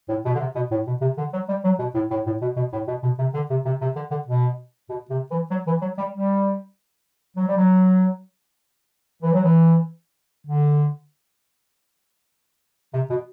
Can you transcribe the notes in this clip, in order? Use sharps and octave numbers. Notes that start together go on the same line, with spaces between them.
A2
B2
D3
C3
B2
A2
B2
C3
D3
F#3
G3
F#3
B2
A2
A2
A2
B2
B2
A2
B2
B2
C3
D3
C3
C3
C3
D3
D3
B2
B2
C3
E3
F#3
E3
F#3
G3
G3
F#3
G3
F#3
E3
F#3
E3
D3
C3
B2